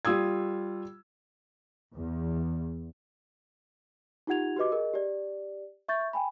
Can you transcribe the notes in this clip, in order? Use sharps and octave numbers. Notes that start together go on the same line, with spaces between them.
G3 F4 D#6 E6 G#6
E2
D#4 F4 G4 F#5 G#6 F7
F#4 G4 B4 D#5 D6
G#4 A#4 D#5
G4 D5
E5 C#6 G6 A6
G5 G#5 B5